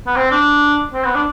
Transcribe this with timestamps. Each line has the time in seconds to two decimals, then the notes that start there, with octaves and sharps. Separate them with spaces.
0.07 B3
0.16 C4
0.31 D4
0.94 C4
1.04 B3
1.15 D4